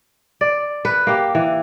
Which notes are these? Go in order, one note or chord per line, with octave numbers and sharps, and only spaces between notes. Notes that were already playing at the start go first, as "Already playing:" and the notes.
D5
B4
A#3 G4
E3